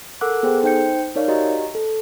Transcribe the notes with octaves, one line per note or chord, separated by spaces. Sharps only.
A4 A#4 F#5 D6 E6 F#6
B3 G#4 A4 C5 G5
D#4 C5 G5 G6 C#7
D#4 A#4 C#5 D5 F5
F#4 G4 D#5 A#5
A4